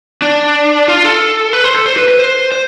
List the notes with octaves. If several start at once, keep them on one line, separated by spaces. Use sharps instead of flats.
D4
F4
A4
B4
C5
A4
C5
B4
B4
C5
C5